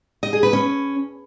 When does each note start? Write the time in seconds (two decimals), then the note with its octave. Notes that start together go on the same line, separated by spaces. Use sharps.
0.23 D#5
0.33 G#4
0.43 B4
0.53 C#4